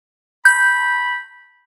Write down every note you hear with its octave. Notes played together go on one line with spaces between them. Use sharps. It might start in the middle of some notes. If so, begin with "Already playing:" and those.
B5 G6